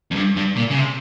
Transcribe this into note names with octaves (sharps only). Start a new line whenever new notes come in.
F2
G2
G2
A#2
C#3
C3